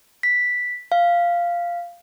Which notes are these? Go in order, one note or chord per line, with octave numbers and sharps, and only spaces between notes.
B6
F5